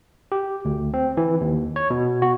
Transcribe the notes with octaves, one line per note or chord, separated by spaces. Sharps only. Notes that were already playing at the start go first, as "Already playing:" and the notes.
G4
D2
C4
E3
D#2
C#5
B2
F#4